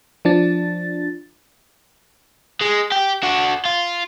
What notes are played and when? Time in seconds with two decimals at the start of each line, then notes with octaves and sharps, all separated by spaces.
0.25 F3 D4 A6
2.61 G#3
2.92 G4
3.23 D4 F#4
3.65 F4